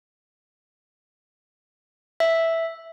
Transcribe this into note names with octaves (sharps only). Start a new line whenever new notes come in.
E5